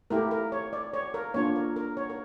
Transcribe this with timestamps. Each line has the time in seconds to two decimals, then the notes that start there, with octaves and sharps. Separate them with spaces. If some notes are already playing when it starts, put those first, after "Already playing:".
0.10 A3 E4 G4 A#4
0.31 A#4
0.52 C#5
0.73 D5
0.93 C#5
1.14 A#4
1.34 A#3 D4 F4 C#5
1.56 A#4
1.76 A#4
1.97 C#5
2.10 A#4